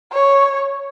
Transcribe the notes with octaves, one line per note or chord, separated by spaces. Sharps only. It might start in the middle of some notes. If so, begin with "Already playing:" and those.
C#5